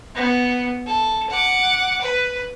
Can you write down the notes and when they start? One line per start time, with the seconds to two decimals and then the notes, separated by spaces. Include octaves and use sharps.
0.15 B3
0.87 A4
1.30 F#5 D6
2.02 B4